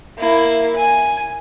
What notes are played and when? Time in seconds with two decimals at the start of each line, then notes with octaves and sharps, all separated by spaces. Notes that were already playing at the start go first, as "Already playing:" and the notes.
0.18 A#3 E4
0.76 G#5